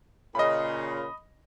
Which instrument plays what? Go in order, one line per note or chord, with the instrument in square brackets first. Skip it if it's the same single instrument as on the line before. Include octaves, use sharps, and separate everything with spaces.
[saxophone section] A#2 C#3 [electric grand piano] D#5 B5